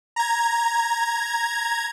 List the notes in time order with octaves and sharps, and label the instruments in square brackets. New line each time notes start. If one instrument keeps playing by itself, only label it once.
[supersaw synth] A#5 G#6